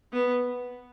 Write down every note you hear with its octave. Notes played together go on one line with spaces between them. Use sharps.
B3